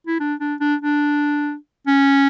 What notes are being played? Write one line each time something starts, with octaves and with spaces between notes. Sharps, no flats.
E4
D4
D4
D4
D4
C#4